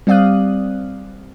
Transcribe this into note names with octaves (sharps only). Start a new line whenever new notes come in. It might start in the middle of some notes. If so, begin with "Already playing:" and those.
G3 C4 D5 F5 D#6 F#6